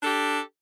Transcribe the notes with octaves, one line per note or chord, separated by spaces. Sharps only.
D4 G4 A4